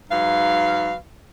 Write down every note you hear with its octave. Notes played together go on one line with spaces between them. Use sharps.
G#2 F#3 B4 F5